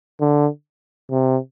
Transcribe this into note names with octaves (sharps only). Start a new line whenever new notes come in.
D3
C3